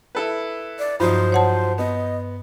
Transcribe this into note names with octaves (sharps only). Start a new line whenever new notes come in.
E4 A4 B4
D5
G2 F3 F#3 D#4 C5
C#5 F#5 A5
B3 D#5